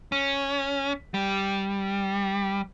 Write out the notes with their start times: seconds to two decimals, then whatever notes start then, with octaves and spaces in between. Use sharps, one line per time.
0.12 C#4
1.14 G3